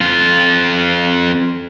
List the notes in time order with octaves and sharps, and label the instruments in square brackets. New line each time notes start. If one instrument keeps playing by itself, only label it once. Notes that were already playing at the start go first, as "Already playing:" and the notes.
[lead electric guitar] F2 F4